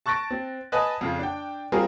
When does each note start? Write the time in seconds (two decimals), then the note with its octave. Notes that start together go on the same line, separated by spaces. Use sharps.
0.06 A5 C#6 F#6 A6 A#6 D7
0.30 C4
0.72 B4 D#5 G#5 A5 F#6
1.01 F2 C#3
1.19 D4 G5
1.72 G3 C4 F4 G#4 A#4